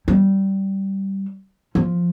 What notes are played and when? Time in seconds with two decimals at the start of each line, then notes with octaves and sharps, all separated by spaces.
0.08 G3
1.75 F3